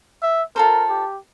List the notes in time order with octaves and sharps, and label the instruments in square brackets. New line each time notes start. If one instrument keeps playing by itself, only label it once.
[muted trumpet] E5
[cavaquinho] F4 A4 C5 [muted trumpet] A#4
[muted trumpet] G4